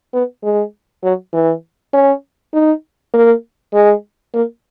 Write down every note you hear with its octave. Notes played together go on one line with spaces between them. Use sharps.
B3
G#3
F#3
E3
C#4
D#4
A#3
G#3
A#3